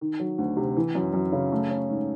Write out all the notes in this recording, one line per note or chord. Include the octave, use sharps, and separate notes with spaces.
D#3
F#3
D2
C3
E3
F#2
F#2
C#3
A3
C#4
G#2